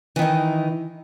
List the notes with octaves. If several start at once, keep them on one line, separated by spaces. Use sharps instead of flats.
D#3 E3 D#4